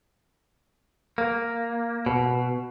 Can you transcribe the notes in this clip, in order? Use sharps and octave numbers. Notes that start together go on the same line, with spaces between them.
A#3
B2